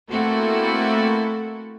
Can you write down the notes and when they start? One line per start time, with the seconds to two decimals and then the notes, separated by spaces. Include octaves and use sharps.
0.10 A3 A#3 C4 E4 F#4 A4